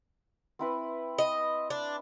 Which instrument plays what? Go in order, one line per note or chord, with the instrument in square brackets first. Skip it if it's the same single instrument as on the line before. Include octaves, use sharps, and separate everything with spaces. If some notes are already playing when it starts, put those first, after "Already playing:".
[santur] C4 E4 B4
[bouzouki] D#5
D4